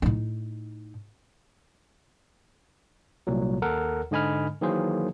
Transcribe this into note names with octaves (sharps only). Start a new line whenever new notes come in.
A2 D#4
C2 A#2 F#3
D#2 A4 A#4 F#5
G#2 D3 D#5 G#5 B5 F6
D#3 E3 F#3 A#3 G#4 C5